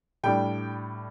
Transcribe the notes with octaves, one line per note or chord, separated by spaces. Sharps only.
A2 G3 D4 G5